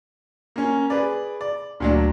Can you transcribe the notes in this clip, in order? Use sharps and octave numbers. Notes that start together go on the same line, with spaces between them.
A#3 C#4
G#4 B4 D5
D5
D2 A#2 F#3 A3 D4